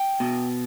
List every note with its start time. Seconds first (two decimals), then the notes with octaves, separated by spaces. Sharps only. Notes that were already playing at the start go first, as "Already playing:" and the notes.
Already playing: G5
0.20 B2